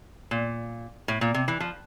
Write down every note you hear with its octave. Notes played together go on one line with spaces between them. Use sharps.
A#2
A2
A#2
C3
E3
F3